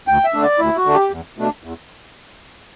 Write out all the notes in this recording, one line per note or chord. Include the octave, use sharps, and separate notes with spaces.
D2 G5
E5
D3 A3 D4
D5
D2 E4
F#4
D3 A3 D4
G4
E2
B2 A3 D4
E2